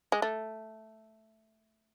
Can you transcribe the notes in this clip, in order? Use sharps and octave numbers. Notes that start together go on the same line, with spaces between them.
G#3
A3